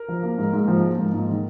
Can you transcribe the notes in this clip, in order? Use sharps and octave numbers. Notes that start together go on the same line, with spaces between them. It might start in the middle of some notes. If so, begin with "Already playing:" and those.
Already playing: A#4
F3
A#3
G#2
G#2
F3
A#3
G#2
G#2
D#3